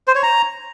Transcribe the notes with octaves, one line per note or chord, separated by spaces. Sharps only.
C5
C#5
A#5